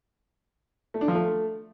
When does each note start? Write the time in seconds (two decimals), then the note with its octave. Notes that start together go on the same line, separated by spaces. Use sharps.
0.94 A3
1.01 D4
1.08 F3
1.15 A3